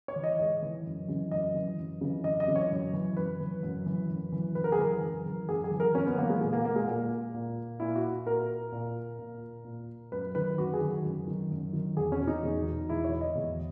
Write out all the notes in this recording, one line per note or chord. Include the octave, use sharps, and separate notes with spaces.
C#5
E3
D#5
G#2 D#5
E3
F#2
C#3 E3
F#2 D#5
C#3 E3
F#2
C#3 E3
F#2 D#5
D#5
C#3 E3
C#5
F#2
E3
F#2 B4
E3
F#2
E3
F#2
E3
F#2 B4
A#4
G#4
E3 A#4
F#2
E3
F#2 G#4
G#4
E3
A#4
F#2 C#4
B3
E3 A#3
G#3
A#2 G#3
A#3
A#3
G#3
A#2 A#3
A#2
A#2 E4
F#4
A#2 A#4
A#2
A#2
A#2
F#2 B4
D#3 B4
F#2 F#4
G#4
D#3
F#2
D#3
F#2
D#3
E2 G#4
C#4
B2
D#4
E2
B2
E2 E4
C#5
B2
D#5
E2